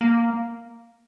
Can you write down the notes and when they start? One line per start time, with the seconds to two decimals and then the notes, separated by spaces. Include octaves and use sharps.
0.01 A#3